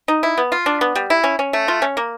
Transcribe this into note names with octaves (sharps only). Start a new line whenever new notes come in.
D#4
E4
B3
F4
D4
B3
G3
E4
C#4
C#4
A3
F4
C#4
A#3